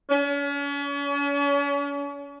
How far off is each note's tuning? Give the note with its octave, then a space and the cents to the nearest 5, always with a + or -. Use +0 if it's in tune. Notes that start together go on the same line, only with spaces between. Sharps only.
C#4 +40